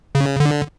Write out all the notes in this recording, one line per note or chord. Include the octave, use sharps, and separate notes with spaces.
C#3
D3